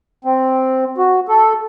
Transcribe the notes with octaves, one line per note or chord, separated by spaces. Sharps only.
C4
F#4
A4